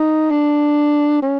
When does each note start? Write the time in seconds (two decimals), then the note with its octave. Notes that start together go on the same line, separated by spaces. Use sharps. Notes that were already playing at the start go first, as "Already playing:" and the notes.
Already playing: D#4
0.30 D4
1.22 C#4